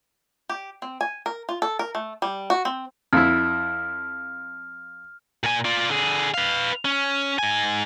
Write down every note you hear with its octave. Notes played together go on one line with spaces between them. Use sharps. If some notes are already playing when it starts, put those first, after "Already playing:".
G4
C4
G#5
A#4
F4
A4
A#4
A3
G3
F#4
C4
F2 E4 F6
A#2 G#5
F4 D5
D3 G#4
B4 F5
C#4
G#2 G#5